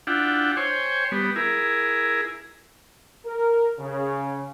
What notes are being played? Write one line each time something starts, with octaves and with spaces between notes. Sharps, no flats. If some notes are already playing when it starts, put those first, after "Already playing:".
D4 E4 F4 F#5 G5
C5 C#5 G5 G#5
G3 B3
E4 G#4 A#4
A#4
C#3